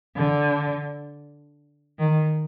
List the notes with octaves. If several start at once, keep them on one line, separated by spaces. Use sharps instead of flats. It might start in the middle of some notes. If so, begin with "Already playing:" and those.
D3
D#3